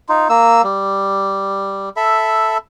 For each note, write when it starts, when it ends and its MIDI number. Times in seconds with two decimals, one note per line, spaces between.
0.09 0.28 63
0.09 0.28 65
0.30 0.62 58
0.30 0.62 88
0.64 1.89 55
1.96 2.58 69
1.96 2.58 76
1.96 2.58 83